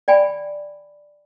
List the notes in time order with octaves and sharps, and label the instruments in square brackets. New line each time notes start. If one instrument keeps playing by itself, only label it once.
[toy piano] D5 G5 G#5 B5